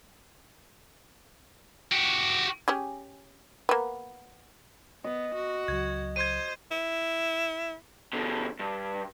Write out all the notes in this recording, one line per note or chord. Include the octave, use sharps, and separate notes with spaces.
F#4 G4
C#4 G4 G#4
A#3 B3
B3 D#5
F#4
C#2 F#3 G#6
C5 G#6 D#7
E4
B2 D3
G2